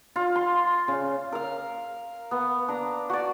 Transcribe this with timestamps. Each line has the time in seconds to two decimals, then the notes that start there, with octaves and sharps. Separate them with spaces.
0.16 F4
0.36 C6
0.88 C#3
1.32 A#4 F5
2.31 B3
2.68 D4 A#5
3.10 F#4 D5